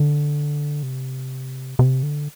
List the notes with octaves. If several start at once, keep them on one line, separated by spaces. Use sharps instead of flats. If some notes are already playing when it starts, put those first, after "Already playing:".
Already playing: D3
C3
C3
D3